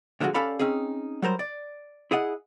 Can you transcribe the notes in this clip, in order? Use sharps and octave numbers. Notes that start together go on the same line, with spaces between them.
A#2 D3 F3 F#3 G#3 F#4
C#4 G4 A4 D5 F5 B5
C4 C#4 D#4 G#4
F#3 G3 A#4 C5
D5
E4 G#4 D#5 F#5